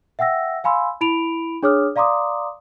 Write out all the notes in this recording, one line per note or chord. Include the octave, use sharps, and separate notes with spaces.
E5 F#5 G5 E6 A#6
F5 G#5 B5 C6 E6
E4 B5 D7 F7
D4 G#4 C#5 D6 D#6 F6
D5 F5 A#5 C6 D6 D#6